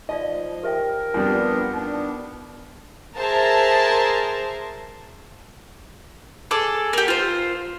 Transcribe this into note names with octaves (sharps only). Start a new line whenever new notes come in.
F3 D#4 F4 D5 D#5
G4 A#4 E5 G5
F2 G3 B3 D4
B3 D4 D#4
G#4 A#4 C5 E5 A5 A#5
G#4 A4 D6
A#3 G4
F4 C5